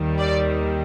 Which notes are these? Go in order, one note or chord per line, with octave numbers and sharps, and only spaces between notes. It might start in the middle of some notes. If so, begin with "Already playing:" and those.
Already playing: D#2 D#3 G3
D5